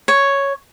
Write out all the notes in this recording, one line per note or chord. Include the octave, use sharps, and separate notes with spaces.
C#5